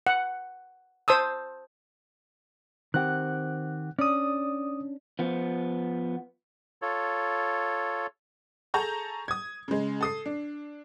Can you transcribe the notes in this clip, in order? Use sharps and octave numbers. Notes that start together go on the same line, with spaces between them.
F#5
C5 A5 D#6 E6
D#3 C4 G4 F#5 F#6
C#4 D4 D5 D#6
F3 B3
F4 A4 C#5
G#4 A4 A5 A#5 C#6 G6
D#6 G#6
C#3 G#3
A4 D#6 C7
D4